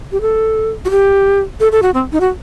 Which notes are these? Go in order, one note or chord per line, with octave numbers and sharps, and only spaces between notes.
G4
A4
F#4
G4
A4
A4
F#4
C4
D#4
F#4